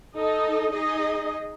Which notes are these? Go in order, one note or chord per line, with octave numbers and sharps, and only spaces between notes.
D#4 A4 D#5
D#4 G#4 D#5